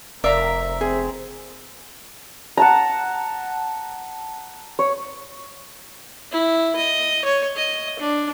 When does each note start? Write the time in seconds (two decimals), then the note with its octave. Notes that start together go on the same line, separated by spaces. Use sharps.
0.24 F1 A#4 D5 E5 F5 A#5
0.81 C4 G#4
2.57 F#5 A5 A#5
4.79 C#5
6.32 E4
6.76 D#5
7.25 C#5
7.56 D#5
7.99 D4